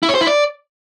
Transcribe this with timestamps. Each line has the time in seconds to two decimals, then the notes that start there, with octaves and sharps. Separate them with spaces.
0.03 E4
0.09 C#5
0.15 C5
0.21 E4
0.27 D5